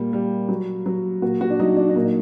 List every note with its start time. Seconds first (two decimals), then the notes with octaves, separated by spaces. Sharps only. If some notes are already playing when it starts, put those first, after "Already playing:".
Already playing: A#2 G3
0.13 G3
0.49 F#3
0.86 F#3
1.22 A#2 F#4
1.41 F#4
1.50 D4
1.60 F#3 D#4
1.77 D4
1.89 D4
1.96 A#2 D#4